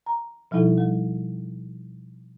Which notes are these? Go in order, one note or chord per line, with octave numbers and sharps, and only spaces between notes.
A#5
B2 F3 G3 D#4 E4 A4
G3